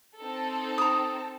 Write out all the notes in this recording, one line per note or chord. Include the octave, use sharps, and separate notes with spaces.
C4 D#4 A4
A#5 D#6